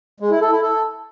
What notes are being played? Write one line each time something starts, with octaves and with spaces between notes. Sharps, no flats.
G#3
E4
A4
E4
A4